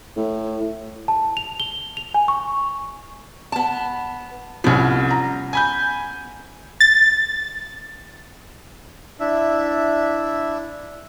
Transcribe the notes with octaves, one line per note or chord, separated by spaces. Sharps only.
A2
A5
F7
G7
F7
G#5
C#6
B3 A5
C2 F3 B3 C#4
A#5
G#5 B5 G6
A6
D4 E4 E5